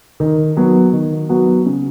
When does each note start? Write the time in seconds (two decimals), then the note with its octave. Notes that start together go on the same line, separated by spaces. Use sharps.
0.20 D#3
0.57 F#3 B3 F#4
0.93 D#3
1.29 F#3 B3 F#4
1.66 C#3